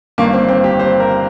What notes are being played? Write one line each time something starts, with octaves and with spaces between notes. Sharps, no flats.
G1 G2 D#3 A#3
C4
C4
G4
C5
A#4